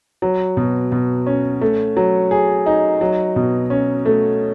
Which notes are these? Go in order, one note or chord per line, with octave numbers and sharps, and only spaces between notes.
F#3
B2
B2
C#4
A3
F#3
G#4
D#4
F#3
B2
C#4
A3